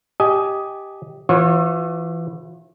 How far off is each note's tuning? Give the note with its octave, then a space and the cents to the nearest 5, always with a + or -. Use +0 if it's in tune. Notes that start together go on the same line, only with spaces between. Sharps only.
G4 +0 D#5 +10 G#5 +20
E3 +20 F4 +45 C#5 -35